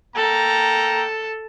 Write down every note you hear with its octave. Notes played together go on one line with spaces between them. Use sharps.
A#3 A4 G5 A#5